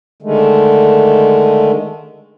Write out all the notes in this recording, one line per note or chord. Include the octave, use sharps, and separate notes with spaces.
D3 D#3 G#3 A3